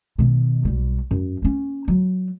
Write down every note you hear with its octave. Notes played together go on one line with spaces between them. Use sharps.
B2 D#3
B1 G3
F#2
A#3 C#4
F#3